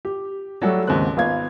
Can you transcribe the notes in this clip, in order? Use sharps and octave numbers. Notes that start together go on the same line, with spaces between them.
G4
F#3 G3 A3 F#4 A4
D#2 G#2 C#3 C4 F#6
G#1 B3 F4 F5 G#6